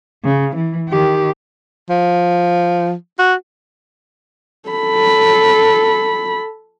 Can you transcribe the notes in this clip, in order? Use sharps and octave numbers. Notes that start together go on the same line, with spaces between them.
C#3
E3
D#3 G4
F3
F#4
A4 B5